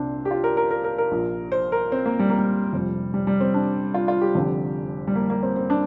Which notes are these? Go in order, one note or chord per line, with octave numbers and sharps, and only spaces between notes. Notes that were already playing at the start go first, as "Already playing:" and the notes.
Already playing: C2 A#2 C4 D4
G4
F4
A#4
A#4
A#4
A#4
A#4
A#1 A#2
C5
A#4
C4
A#3
G3
A#3
G3
F1 F2 C3
G3
G3
C4
D4
F4
F4
G4
F1 F2 D3
G3
A#3
A#3
C4
C4
D4